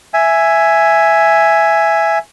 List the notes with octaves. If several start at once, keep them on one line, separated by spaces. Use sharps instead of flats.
E5 G#5